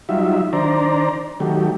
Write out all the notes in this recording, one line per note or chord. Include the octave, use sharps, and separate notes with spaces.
F#3 G3 D#4 F4 E5
D#3 D4 C5 D5 A#5
D#3 F#3 A3 G4